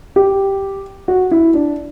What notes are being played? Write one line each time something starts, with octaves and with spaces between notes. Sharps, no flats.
G4
F#4
E4
D4